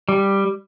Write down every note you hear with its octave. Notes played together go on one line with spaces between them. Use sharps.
G3